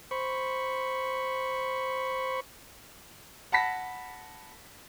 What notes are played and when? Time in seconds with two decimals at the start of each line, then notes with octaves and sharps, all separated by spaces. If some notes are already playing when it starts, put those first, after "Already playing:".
0.11 C5 B5 C#6
3.52 F#5 A5 B5 A#6 B6